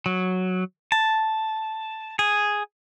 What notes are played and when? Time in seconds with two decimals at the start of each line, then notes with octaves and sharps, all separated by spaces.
0.06 F#3
0.92 A5
2.19 G#4